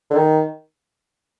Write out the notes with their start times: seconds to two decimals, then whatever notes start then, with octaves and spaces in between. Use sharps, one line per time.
0.10 D3
0.16 D#3